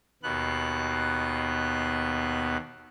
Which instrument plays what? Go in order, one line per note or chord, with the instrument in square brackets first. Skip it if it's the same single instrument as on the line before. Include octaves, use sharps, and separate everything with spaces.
[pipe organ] D#2 B2 B3 F#6